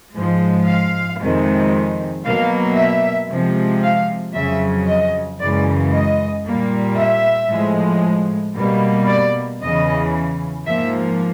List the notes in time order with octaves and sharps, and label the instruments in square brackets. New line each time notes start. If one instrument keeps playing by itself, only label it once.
[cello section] G#2 F3 G#3
F5
F2 C3 D#3 G#3
B2 F#3 A#3 F5
E5
C3 F3 G#3
F5
F2 C#3 F#3 E5
D#5
F#2 C#3 E3 G#3 D5
D#5
A#2 G3 A#3
E5
A2 F3 G#3
B2 G3 A#3
D5
E2 C#3 E3 D#5
G#2 F3 A#3 E5